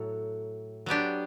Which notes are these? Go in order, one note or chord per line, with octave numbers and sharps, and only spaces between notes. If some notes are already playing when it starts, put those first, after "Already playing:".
Already playing: A2 F#3 A4
F#3 B3 D4 G4